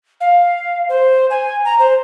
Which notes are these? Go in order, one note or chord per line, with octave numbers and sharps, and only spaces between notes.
F5
C5
G#5
A#5
C5